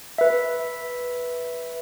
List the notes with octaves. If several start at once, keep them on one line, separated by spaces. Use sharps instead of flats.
B4 E5